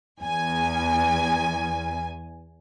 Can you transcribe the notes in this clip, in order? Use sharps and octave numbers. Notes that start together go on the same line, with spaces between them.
E2 G#5